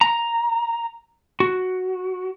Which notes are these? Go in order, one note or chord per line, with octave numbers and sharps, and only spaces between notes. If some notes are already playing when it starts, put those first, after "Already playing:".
A#5
F#4